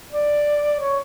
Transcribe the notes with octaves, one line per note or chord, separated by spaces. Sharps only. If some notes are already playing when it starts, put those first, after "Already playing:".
D5
C#5